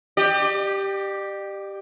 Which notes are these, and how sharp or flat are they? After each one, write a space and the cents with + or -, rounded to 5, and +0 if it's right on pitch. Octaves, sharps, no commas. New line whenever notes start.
G4 +0 D5 +45